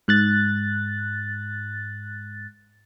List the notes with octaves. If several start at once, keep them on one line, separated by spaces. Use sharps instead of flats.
G#2 F#6 A6